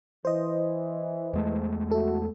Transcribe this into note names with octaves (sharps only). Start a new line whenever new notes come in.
E3 C5 D#5
E2 G#3 A3
E4 F#4 A4